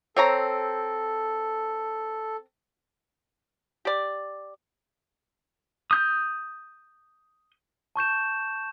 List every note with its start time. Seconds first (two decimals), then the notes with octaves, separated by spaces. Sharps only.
0.17 C4 A4 C#5 A#5
3.85 G4 D5
5.91 D#6 G6
7.96 A5 C#6 G6 E7